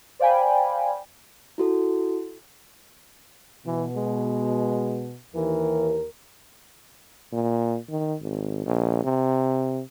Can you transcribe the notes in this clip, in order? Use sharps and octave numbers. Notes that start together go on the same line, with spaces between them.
C5 D5 F5 G5 G#5 B5
E4 F#4 A4
B2 E3
G#3
D#2 E3 A#4
A#2
D#3
G#1
A#1
C3